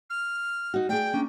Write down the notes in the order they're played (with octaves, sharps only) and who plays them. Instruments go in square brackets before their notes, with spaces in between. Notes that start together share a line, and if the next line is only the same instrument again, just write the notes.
[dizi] F6
[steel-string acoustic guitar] D#4 F#4
[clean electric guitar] A3 [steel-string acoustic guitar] G#4 D5 [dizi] G5
[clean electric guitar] A#3 C#4 D4